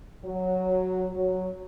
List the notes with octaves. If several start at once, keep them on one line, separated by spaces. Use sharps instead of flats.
F#3
F#3